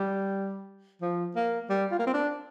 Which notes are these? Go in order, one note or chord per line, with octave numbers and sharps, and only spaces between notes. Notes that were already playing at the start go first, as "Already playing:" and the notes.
Already playing: G3
F3
A#3
G3
F4
A#3
C4
D4